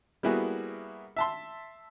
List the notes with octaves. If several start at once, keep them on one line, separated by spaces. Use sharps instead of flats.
G3 A#3 B3 E4 F#4 G#4
E5 A5 C6